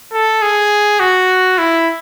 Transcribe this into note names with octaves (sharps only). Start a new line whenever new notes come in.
A4
G#4
F#4
E4